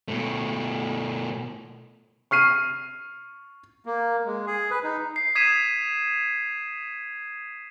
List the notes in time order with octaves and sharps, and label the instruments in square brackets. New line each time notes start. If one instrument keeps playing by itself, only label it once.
[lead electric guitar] B2 A3
[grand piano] C#6 F6 C7 D#7
[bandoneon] A#3
G#3
G#4
B4
D#4
[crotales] C7
D#6 G#6 B6 C7 D#7 E7